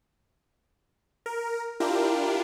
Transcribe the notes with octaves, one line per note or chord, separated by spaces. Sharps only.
A#4
D4 E4 F4 G4 A#4